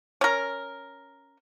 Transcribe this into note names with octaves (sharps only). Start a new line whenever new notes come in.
C#4 A#4